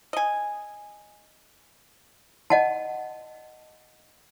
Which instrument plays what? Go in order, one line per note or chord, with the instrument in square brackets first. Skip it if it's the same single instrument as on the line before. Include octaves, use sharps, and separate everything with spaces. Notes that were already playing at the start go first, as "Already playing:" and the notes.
[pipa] D#5 G#5
[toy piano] D#5 F#5 A5